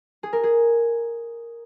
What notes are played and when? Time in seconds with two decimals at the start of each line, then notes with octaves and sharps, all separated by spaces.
0.23 G#4
0.33 A#4
0.43 G#4